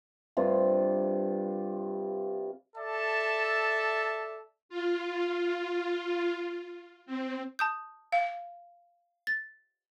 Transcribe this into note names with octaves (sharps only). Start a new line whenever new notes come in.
G2 C3 F4
A4 D5 E5 A5
F4
C4
A5 D#6 G6
F5
A6